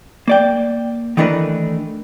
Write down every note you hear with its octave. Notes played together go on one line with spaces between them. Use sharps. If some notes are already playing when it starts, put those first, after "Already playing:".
A#3 D5 G5
D#3 E3 A3 D4 A#4 B4